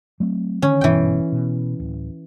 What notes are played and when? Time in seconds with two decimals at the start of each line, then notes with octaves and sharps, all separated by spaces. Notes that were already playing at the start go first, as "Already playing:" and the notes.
0.20 F#3 A3 C4
0.62 D3 D#3 C#4
0.81 G#1 G2 B2 E3 G5
1.32 B2
1.80 D1